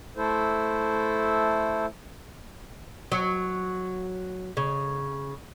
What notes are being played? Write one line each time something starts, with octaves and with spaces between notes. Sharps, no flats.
A3 E4 A4 C5
F#3
C#3